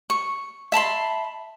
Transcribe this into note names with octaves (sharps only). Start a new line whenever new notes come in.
C#6
E5 A5 B5 C6